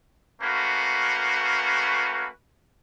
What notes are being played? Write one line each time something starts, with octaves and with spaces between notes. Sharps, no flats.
A3 A#3 C#4 F#4 B4